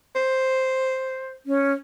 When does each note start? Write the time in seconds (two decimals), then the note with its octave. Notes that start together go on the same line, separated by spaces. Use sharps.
0.15 C5
1.46 C#4